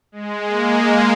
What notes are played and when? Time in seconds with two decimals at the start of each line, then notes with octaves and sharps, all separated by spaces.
0.12 G#3
0.44 A#3